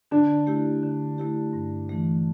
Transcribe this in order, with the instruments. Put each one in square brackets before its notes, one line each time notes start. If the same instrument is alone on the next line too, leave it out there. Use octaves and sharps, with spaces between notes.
[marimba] D3 [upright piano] D4
[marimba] A3 E4 G4
D3
A3 E4 G4
G2
E3 A3